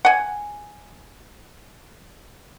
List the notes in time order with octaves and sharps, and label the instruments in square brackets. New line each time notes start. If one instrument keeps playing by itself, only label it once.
[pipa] F#5 G#5